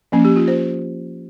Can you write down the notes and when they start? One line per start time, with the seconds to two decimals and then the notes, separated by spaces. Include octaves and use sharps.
0.12 F3 A#3 C#4
0.25 G4
0.36 F4
0.48 C5